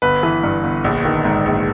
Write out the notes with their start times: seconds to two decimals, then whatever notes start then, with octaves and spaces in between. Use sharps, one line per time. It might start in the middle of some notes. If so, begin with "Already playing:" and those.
0.02 G1 B4
0.23 E3
0.43 G2
0.64 G1
0.84 A#1
1.05 D#3
1.25 G#2
1.46 A#1